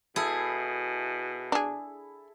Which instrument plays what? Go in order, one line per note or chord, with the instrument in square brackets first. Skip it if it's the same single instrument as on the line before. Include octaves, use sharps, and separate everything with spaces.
[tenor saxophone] B2 [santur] E4 A4 [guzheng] G#4
[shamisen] D4 G#4